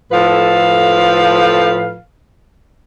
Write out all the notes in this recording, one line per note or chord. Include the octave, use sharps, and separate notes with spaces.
A2 F3 A4 B4 F5